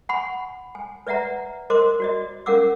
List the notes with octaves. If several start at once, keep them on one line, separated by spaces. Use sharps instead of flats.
F#5 G#5 B5 C#6
G#5
B4 D5 E5 F#5 A#5
A#4 C5 D#5 C6 D6
F#4 D5 D#5
C#4 A#4 F5 F#5 D6 E6